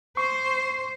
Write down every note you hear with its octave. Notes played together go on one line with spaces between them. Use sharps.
C5 C#6 C7